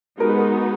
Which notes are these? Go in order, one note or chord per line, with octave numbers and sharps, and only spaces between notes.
G#3 B3 D#4 F#4 A#4
B4
A#4